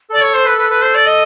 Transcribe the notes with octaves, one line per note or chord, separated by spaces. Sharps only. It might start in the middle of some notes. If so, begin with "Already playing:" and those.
A4 D5
C#5
C5
B4
B4
B4
C5
D5
D#5